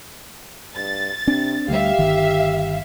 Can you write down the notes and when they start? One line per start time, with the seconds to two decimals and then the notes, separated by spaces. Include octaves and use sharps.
0.77 G2 A6
1.27 C3 C4 D4
1.69 D2 F#3 G3 G4 E5 F5
1.98 G1 D#3